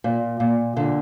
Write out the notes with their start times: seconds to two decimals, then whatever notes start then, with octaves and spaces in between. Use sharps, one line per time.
0.04 A#2
0.40 A#2
0.76 A#2 D3